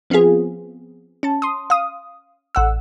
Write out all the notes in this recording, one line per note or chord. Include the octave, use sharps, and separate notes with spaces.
F3 B3 C4 F4 G#4
C#4 A5
C6 D#6
F5 D#6
A1 F#5 E6